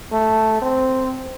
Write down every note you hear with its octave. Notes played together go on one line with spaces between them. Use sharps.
A3
C4